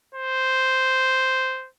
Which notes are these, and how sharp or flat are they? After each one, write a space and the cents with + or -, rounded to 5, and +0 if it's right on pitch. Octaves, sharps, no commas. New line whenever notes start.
C5 -5